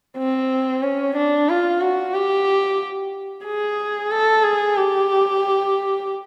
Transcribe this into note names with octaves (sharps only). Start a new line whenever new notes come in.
C4
C#4
D4
F4
F#4
G4
G#4
A4
G#4
G4